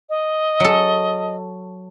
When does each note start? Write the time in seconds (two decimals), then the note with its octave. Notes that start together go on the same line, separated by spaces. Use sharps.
0.09 D#5
0.60 F#3 A4